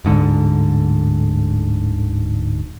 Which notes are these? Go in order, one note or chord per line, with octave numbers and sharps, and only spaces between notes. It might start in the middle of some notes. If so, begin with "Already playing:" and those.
D1 G#2 D3